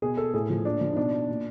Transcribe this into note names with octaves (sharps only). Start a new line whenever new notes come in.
B2 G#4
A4
A2 G#4
F3
A#2 D4
F3
D#4
B2 D4
A#2